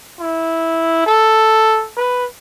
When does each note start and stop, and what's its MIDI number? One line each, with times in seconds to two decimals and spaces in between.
0.20 1.05 64
1.06 1.86 69
1.97 2.25 71